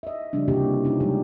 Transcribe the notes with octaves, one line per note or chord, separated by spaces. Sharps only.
D#5 E5
C#3 F3 G3 D4
C3 E3 A#3 D4 F#4 G4
C#4 D#4 F4
F3 G3 G#3 D#4 G4